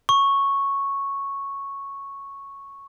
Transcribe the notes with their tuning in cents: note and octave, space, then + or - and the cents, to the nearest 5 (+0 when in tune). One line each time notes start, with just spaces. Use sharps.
C#6 -5